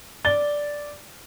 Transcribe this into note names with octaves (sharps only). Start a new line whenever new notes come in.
D5 A6 G7